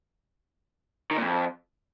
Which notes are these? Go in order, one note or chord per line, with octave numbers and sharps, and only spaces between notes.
D#3
A#2
F2